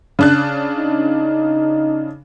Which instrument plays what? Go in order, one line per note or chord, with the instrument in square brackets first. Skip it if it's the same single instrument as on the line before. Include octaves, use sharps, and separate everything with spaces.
[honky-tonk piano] C#3 D4 F#6
[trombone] D#4